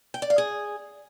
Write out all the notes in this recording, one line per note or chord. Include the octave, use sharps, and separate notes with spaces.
G5
D5
F5
G#4